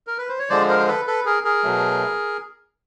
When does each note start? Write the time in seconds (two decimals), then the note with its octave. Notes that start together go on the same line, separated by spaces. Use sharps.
0.07 A#4
0.18 B4
0.29 C5
0.39 C#5
0.49 D3 F3 G#3 C5 D5
0.68 A#4 C5
0.79 C5
0.88 A4 B4
1.07 A4 B4
1.25 G#4 A#4
1.45 G#4 A#4
1.64 B2 F#3 A3